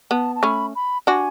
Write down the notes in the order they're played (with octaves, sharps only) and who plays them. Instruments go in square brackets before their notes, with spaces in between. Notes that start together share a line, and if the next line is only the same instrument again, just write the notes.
[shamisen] B3 [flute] A5
[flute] A5
[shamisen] A3 C#4 [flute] B5
[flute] B5
[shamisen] D4 F#4 [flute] G#5